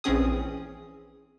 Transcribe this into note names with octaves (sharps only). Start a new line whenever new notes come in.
A#1 E3 C4 C#4 G#4 D#6